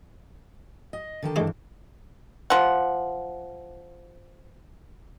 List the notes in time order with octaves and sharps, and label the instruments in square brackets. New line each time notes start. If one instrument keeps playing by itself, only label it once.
[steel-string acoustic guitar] D#5
D3 D#3 A5
[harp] G2 E3 [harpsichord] G#3 A3 G#4
[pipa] F3 F#5